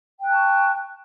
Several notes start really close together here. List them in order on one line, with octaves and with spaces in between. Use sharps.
G5 F#6 A5 C#6